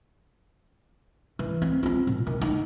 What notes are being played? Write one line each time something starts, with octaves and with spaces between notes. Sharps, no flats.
E3
C4
C4 F4
A#2
D#3
D#4